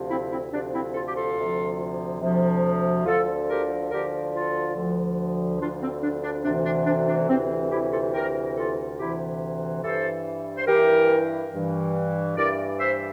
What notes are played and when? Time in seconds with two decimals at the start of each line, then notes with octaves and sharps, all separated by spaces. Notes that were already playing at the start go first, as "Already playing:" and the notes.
Already playing: D2 C3 F3
0.10 C4 E4
0.31 C4 E4
0.52 D2 C3 F3 D4
0.73 C4 E4
0.94 F4 A4
1.07 G4
1.15 F4 A4
1.37 D2 C3 F3
2.21 D2 C3 F3
3.06 D2 D3 F3 F4 A4
3.48 G4 A#4
3.90 D2 D3 F3 G4 A#4
4.33 F4 A4
4.75 D2 D3 F3
5.60 D2 D3 F3 D4 F4
5.81 C4
6.02 D4
6.23 D4
6.44 D2 C3 E3 D4
6.66 D4
6.86 D4
7.08 D4
7.29 D2 C3 E3 C4
7.71 E4 G4
7.92 F4 A4
8.13 D2 C3 E3 G4 A#4
8.56 F4 A4
8.98 D2 C3 E3 E4 G4
9.83 G2 E3 A4 C5
10.57 C5
10.67 G2 E3 G4 A#4
11.52 G2 E3
12.36 G2 E3 A#4 D5
12.78 C5 E5